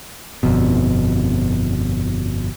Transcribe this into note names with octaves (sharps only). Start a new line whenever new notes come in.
G1 F2 B2